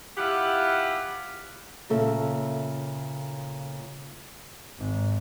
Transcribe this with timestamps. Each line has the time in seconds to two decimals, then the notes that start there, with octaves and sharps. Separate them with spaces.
0.17 E4 F4 G4 E5 F#5
1.90 A#2 C#3 A4 E5
4.78 G#1